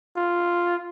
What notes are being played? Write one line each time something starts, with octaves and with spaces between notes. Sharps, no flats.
F4